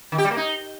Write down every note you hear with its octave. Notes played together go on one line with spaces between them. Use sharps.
D#3
G4
G3
A#3
D#4